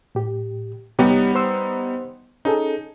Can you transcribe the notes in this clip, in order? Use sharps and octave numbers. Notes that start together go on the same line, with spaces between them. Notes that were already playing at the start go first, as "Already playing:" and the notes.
A2 G4
C2 G3 B3 D#4 G4 C#5
C5 C6 E6
C#4 D#4 G#4 A4